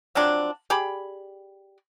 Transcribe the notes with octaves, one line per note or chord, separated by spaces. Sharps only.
F3 F#3 C4 D4
G4 G#4 D5 B5